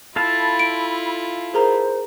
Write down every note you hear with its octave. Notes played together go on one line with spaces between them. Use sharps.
E4 F4 A4 F5 A5 B5
D7
G#4 A#4 C5 A#5